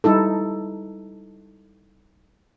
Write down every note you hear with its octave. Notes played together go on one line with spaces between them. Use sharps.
G3 D#4 E4 A4